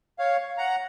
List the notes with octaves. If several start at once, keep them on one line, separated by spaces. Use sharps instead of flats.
C#5 F5
F#5 A#5